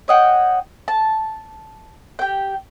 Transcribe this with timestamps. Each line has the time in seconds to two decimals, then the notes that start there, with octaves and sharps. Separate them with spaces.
0.08 C#5 D#5 F#5 G5
0.88 A5
2.19 G4 G5